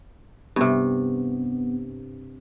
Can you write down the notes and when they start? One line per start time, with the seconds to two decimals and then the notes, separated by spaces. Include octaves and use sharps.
0.56 G2 C3 B3